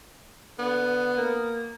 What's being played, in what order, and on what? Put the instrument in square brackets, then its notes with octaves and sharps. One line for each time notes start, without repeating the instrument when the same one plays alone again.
[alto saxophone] D3 [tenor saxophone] B3
[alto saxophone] A#3